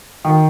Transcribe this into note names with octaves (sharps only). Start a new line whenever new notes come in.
D#3